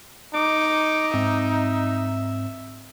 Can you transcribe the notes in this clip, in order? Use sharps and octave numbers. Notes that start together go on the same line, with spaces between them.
D#4 D6
G#2 C4 E5